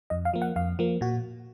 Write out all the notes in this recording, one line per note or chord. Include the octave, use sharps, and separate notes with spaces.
F2 D#5
F5
F3 A#3
F#5
F2 F5
F3 A#3
A#2 F#4